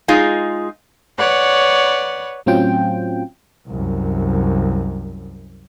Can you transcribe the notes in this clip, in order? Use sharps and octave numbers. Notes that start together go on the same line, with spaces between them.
G#3 D#4 F4 G#4
B4 C#5 D5 F#5
A2 F#3 C4 C#4 F4 G5
C2 F#2